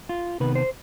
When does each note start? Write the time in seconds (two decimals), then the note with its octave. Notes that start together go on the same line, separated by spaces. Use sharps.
0.09 F4
0.40 C3 D#3 B3 B4
0.55 C5